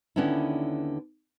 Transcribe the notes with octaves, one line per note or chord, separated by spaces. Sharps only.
D#2 D3 B3 C#4 D4 E4